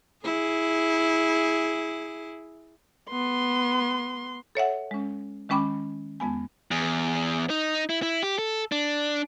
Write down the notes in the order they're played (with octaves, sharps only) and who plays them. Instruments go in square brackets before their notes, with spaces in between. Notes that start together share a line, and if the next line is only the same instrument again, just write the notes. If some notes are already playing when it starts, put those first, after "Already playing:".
[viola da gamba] E4 G#4
[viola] B3 C6
[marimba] A4 C#5 E5 F#5
G#3 C#4
D#3 G#3 C#4 G5 B5 D6
F2 G#3 B3 G#5
[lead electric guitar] E2
D#4
E4
E4
G4
A4
D4